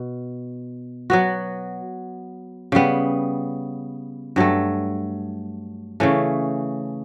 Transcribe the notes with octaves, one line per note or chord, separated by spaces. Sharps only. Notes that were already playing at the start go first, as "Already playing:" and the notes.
Already playing: B2
F#3 B3 F#4
C#3 G3 B3
G2 F#3 A3
C#3 E3 A3 C#4